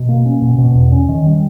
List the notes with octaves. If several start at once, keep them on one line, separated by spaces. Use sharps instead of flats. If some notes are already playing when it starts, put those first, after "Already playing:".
Already playing: B2
A#3
C#4
B2
B2
E2
C#4
D#3
G3